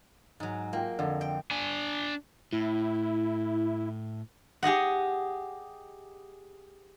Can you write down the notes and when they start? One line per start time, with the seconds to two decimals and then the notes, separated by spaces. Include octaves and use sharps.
0.40 G#2 F#3
0.73 A#3 F4 G5
0.99 F2 D3
1.21 G5
1.51 D4 G#5
2.53 A2 E4
4.63 G4 G#4 D#5 F#5